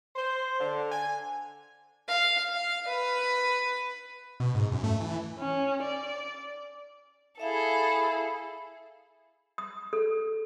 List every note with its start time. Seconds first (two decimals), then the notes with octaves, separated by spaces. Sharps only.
0.15 C5
0.60 D3
0.91 G#5
2.08 F5
2.52 F5
2.87 B4
4.40 B2
4.55 G#2
4.72 F#2
4.84 A3
5.00 E3
5.39 C#4
5.82 D5
7.40 E4 G#4 A4 E5 F5
9.58 D#6
9.93 A4